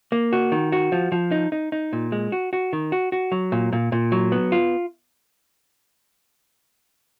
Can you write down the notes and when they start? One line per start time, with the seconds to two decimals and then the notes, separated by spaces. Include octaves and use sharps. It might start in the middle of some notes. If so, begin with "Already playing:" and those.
0.12 A#3
0.33 F#4
0.52 D#3
0.72 F#4
0.92 F3
1.12 F3
1.31 D#4
1.52 D#4
1.72 D#4
1.93 A#2
2.12 G#3
2.32 F#4
2.53 F#4
2.73 D#3
2.92 F#4
3.12 F#4
3.32 F#3
3.52 A#2
3.73 A#2
3.92 A#2
4.12 F#3
4.32 B3
4.52 F4